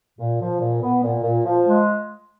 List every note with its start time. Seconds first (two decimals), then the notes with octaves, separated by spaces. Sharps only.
0.19 A#2
0.41 F3
0.61 A#2
0.83 B3
1.03 A#2
1.23 A#2
1.44 F3
1.66 G#3